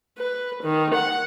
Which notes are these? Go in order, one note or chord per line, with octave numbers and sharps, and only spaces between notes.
B4
D#3
F#5